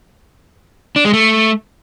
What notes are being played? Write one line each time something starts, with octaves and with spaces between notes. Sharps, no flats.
D4
G#3
A3